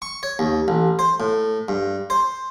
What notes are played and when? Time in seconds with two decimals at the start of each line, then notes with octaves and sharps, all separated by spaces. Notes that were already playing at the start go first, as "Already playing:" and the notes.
0.02 C#6
0.23 C#5
0.39 D#2
0.68 A1
0.99 C5
1.20 A2
1.68 G2
2.10 C5